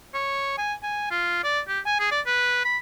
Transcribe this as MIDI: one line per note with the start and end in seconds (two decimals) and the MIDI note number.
0.14 0.57 73
0.57 0.74 80
0.83 1.10 80
1.11 1.40 65
1.44 1.60 74
1.68 1.80 67
1.86 1.99 80
1.99 2.10 68
2.11 2.20 74
2.26 2.62 71
2.64 2.78 83